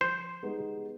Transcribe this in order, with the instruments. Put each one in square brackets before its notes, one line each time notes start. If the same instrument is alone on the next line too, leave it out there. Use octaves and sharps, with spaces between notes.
[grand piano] F3 [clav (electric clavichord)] C5
[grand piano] G#3 B3 D#4 G4